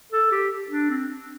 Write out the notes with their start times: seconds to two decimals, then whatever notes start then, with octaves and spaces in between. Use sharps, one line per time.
0.12 A4
0.32 G4
0.70 D4
0.90 C4